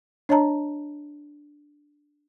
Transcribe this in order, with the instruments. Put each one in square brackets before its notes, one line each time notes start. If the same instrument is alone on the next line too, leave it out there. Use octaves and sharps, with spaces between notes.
[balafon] D4 C#5 D#5 A5 A#5